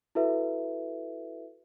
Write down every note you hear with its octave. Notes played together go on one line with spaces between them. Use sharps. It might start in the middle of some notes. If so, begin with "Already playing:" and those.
E4 F#4 A4 B4 E5